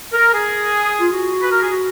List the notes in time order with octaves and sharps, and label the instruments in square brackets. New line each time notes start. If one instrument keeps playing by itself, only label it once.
[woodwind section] A#4
G#4
F4
F#4
B4
A#4
G#4
F#4